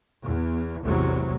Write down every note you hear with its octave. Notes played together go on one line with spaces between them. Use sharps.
E2
A1 E2 A2 C3 F#3